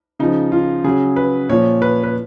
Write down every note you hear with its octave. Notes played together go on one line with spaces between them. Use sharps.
C#3 F3 D#4
F4
C#3 F#3 G#4
B4
A#2 F3 C#5
B4
B4